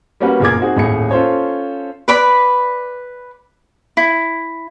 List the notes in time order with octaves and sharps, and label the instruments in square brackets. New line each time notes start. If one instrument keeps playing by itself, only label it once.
[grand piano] G3 A#3 C#4 F#4 B4
F#1 A#2 G#4 A#4 D6 G#6
C4 D#4 F#4 G#4
D#1 A2 G#4 C#7
C#4 F4 A4 C5 C#5
[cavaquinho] B4 D5 B5
E4